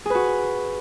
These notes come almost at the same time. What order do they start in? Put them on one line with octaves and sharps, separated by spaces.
G#4 B4 F#4